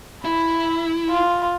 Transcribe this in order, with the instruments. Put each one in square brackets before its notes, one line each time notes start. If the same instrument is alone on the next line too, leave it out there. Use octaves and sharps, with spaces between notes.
[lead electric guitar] E4 [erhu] B5
[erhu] F4